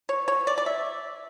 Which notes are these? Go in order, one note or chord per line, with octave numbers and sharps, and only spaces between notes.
C#5
C#5
D5
D5
E5